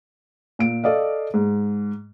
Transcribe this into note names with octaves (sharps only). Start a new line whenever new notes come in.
A#2 D7
A4 D5 D#5 F5
G#2